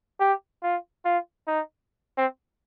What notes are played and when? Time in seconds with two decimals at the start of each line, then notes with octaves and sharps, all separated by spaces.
0.20 G4
0.63 F4
1.05 F4
1.47 D#4
2.17 C4